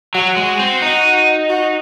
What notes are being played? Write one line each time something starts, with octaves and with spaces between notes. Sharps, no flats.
F#3 F#4
G#3
C4
D#4
F#4